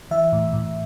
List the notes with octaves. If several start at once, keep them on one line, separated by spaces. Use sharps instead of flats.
E3 E5
A2
A2